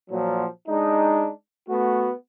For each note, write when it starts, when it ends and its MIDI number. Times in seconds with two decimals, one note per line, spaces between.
0.11 0.45 46
0.11 0.45 53
0.11 0.45 54
0.68 1.30 56
0.68 1.30 62
0.68 1.30 63
1.69 2.12 57
1.69 2.12 59
1.69 2.12 66